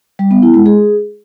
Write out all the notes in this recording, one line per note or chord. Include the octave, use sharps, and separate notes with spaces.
G3
B3
E4
G#3
G#4